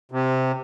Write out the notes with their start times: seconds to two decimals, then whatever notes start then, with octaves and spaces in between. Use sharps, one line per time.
0.12 C3